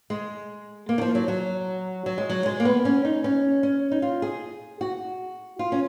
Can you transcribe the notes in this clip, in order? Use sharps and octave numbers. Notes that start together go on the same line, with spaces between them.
G#3
A#3
D#3
F3
F#3
F#3
F#3
G#3
F#3
G#3
A#3
B3
C#4
D#4
C#4
C#4
D#4
F4
G#4
F#4
F4
C#4